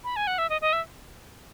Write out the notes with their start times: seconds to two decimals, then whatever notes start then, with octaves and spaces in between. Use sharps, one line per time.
0.04 B5
0.16 G#5
0.27 F#5
0.38 E5
0.50 D#5
0.61 D#5
0.73 E5